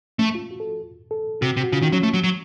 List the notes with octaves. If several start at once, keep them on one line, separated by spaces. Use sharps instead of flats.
A3 C#4
F4
F#4
A4
A4
C3 F#4
C3
F#4
C#3 F4
D#3 C#4
F#3 C#4
A3
F#3
F#3